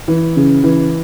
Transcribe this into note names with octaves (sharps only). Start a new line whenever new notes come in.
E3
C#3
E3